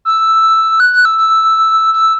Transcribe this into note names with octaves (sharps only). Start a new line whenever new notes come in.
E6
F#6
F#6
E6
E6
E6